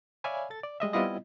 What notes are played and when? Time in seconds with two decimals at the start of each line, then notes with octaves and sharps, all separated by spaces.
0.24 C#5 D5 E5 F5 G#5 B5
0.50 A4 A6
0.63 D5
0.80 G3 G#3 D#5 E5
0.93 G3 B3 C4 E4 F4 D#5